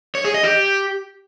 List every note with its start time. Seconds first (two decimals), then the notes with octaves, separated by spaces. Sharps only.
0.15 C#5
0.25 G#4
0.34 D#5
0.44 G4